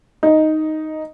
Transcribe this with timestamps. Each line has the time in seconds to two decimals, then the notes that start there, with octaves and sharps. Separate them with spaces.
0.23 D#4 D#5